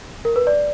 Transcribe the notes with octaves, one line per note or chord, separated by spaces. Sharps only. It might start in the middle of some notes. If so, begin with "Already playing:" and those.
A#4
B4
D5